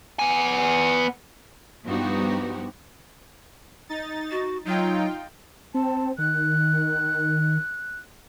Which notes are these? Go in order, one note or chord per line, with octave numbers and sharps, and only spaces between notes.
B3 G#5
G2 F3 B3 D#4 F#4 G4
D#4 A6
F#4
F#3 D#4 F4 G5
C4 A5
D#3 F#6